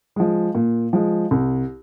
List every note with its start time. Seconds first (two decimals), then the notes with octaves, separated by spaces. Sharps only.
0.16 F3 G#3
0.55 A#2
0.93 F3 G#3
1.31 C2